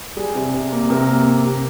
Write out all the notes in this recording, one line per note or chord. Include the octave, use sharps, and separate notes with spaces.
G3 G#4
C3
C3
A#3
C3 A#4
A#3
A#3
C3